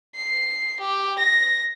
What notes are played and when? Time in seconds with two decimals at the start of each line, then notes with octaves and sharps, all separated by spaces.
0.15 C7
0.80 G4
1.18 A#6